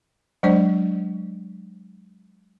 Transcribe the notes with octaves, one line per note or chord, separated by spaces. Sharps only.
F#3 G#3 D4 C5 D5